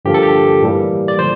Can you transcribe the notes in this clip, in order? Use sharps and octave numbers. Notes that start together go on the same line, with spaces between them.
G2 D3 F3 A#3 G4
A4
G4
A2 E3 G3 A#3
D5
D3 F3 C5